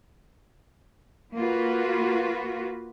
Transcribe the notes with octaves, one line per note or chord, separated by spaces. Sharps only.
A#3 F4 F#4 B4